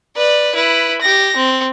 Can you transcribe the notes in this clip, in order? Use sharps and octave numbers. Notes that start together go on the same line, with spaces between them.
B4 D5
E4 B4
G4 A#6
C4